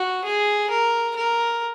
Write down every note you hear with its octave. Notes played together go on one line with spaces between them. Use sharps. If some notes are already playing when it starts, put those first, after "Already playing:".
Already playing: F#4
G#4
A#4
A#4